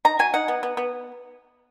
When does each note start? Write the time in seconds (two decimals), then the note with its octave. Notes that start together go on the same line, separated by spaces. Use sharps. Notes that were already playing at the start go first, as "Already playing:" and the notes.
0.05 D#4 A#5
0.19 F#3 G#5
0.34 D#4 F#5
0.48 B3
0.63 B3
0.77 B3